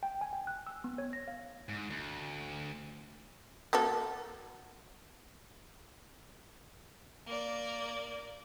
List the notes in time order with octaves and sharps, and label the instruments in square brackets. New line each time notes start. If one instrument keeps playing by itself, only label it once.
[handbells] G5
G#5
G5
F#6
E6
B3
C#5
A#6
F5
[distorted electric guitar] G#2
D2
[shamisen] A#3 F#4 A4
[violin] A#3 D5